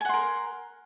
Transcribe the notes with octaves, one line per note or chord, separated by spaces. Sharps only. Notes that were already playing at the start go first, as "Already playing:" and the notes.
A#4 F#5 G#5 C6